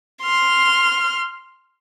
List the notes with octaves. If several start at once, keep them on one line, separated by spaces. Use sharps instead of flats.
C6 F6